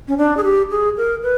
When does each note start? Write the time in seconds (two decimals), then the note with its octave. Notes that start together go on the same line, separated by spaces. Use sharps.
0.08 C#4
0.18 D4
0.37 G#4
0.44 G4
0.71 G#4
0.97 A#4
1.23 B4